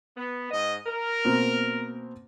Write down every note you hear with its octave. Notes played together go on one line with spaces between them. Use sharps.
B3
G#2 D#5
A#4
B2 A#3 C4